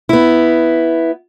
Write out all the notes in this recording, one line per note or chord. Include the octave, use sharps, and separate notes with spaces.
B3 E4